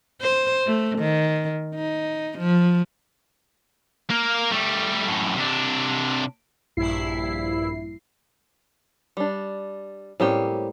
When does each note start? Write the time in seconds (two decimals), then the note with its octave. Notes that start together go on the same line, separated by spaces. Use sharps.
0.21 C5
0.67 A3
0.99 D#3
1.75 D#4
2.39 F3
4.10 A#3 A#4
4.51 G3 A3
5.07 F#2 A2
5.37 C3 D4
6.77 A#1 G2 E4 C7
9.17 G3 D4
10.20 A2 G3 A#3 C4 C#4 G4